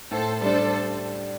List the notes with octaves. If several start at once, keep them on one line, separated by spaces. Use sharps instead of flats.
A2 A4 C5
G3 D4 A4 C5